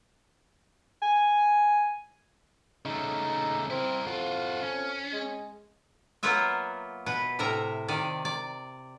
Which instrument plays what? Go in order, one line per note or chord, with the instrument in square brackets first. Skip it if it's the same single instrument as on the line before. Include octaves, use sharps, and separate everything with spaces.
[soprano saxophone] G#5
[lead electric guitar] C#3 A3 [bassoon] D#4
[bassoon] C4 [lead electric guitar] E4 A#4
[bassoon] F2 [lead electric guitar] F4 F#4
[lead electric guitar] C#4
[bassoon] G#3
[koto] F#3 A#3 B3 F4 E5
B2 B4
A2 C3 A#4 E5 A#5
C3 D#3 D5
D5